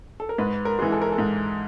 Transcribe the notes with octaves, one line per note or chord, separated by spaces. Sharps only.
A4
A#4
G#2 B4
A#4
E3 G#3
A4
A#4
A4
G#2